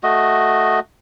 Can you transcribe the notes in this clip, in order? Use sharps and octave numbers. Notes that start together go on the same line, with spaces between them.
A3 F#4 D#5